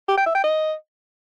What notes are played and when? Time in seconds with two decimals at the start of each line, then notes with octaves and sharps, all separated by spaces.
0.08 G4
0.17 G5
0.26 E5
0.35 G5
0.44 D#5